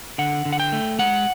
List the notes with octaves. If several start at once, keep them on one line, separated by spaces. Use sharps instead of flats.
D3 F#5
D3
F#5
G5
A3
G#3 F#5